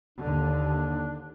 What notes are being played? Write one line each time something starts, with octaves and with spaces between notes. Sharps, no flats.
D#2 D3 D4